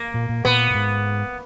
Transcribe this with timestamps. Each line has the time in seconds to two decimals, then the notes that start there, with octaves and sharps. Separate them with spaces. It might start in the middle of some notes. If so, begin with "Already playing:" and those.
Already playing: A#3
0.14 A#2
0.29 A#2
0.45 A#2 B3
0.71 A#2
0.75 G#2